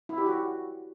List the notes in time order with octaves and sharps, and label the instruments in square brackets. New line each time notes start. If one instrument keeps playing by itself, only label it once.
[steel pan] E4
G4
F#4